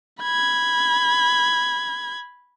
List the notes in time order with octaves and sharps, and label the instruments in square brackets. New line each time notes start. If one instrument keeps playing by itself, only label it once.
[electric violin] B5 G#6